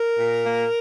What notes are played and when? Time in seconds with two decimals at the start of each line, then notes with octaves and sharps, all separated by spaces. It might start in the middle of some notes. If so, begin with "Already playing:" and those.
Already playing: A#4
0.18 A#2
0.44 A#3